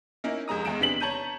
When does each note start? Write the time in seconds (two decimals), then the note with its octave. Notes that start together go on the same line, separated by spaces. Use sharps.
0.24 A#3 C#4 D#4 E4 A#4
0.48 F1 G#3 A#5 D#6
0.65 E2 G#3 D7 E7
0.81 C3 B3 D4 B6 F7 F#7
1.00 C#5 A5 A#5 G6 D#7